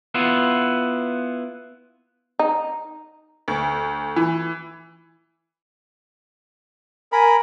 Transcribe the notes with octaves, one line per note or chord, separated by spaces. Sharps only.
B3 E4 F4
D#4
D2
E3
A#4 G#5 B5